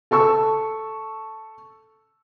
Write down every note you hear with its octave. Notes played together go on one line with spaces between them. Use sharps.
A4 A5 C#6 E6